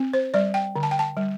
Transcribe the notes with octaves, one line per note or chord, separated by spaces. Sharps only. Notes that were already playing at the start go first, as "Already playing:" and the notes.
Already playing: C4
C5
G3 D5
G5
D3
A5
G5
A5
G3